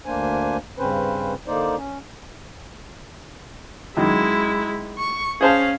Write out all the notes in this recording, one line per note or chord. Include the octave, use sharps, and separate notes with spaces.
D2 A#3 D4 C5 G#5
G2 C#3 C4 C#4 B4 C5
D3 A#3 D#4 C5 D5
C#4
F#2 D#3 G#3 E4
C#6
C#4 G#4 C5 F5 A5